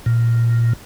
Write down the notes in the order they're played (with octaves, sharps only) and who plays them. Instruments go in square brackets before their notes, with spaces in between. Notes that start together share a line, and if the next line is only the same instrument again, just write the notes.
[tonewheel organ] A#2